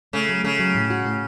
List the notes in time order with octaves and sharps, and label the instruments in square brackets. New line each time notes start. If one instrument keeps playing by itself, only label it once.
[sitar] C#3 [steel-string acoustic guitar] A3
[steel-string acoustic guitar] F#3
[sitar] C#3 [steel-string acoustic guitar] A3
[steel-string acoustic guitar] F#3
A2
F#4
A2